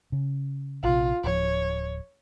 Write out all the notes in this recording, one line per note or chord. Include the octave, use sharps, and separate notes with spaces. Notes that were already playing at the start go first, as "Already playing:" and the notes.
C#3
A#1 C3 F4
D1 F3 C#5